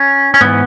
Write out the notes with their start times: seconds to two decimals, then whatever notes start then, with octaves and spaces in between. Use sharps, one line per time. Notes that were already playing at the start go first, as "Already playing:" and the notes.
Already playing: C#4
0.34 C#4
0.41 G#2 E3 B3